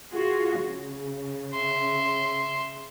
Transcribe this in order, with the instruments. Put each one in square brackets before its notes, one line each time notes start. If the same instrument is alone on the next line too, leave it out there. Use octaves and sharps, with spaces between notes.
[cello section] F4 F#4 G#4
C#3
[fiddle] E5 C6